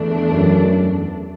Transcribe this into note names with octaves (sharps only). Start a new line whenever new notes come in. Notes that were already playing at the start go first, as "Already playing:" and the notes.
Already playing: E2 E3 A3 D4
F#2